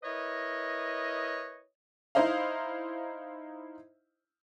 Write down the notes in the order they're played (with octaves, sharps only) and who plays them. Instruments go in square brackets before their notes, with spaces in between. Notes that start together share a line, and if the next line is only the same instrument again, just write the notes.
[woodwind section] E4 A#4 B4 C#5 D#5
[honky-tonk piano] D#4 E4 C5 D#5 F5